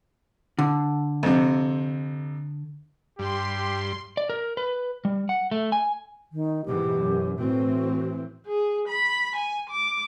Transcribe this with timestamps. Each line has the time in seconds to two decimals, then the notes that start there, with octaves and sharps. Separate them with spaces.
0.59 D3
1.23 F2 C3
3.19 G2 G4 C6
4.17 D5
4.30 A#4
4.57 B4
5.05 G3
5.29 F#5
5.51 A3
5.72 G#5
6.32 D#3
6.66 G#2 B2 E3 G4
6.98 F#2
7.39 A2 E3 C4 F#4
8.46 G#4
8.88 B5
9.36 G#5
9.70 D6